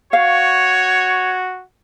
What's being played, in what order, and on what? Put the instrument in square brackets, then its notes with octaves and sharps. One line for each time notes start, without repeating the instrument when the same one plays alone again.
[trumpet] F#4 [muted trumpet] C#5 [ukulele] F5